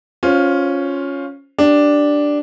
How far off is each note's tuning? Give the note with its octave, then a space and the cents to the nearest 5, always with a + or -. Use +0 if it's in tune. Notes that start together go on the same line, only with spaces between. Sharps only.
C#4 +0 F4 +10 C5 +15
D4 +0 G4 +0